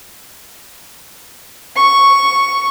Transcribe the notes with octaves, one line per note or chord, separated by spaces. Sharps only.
C#6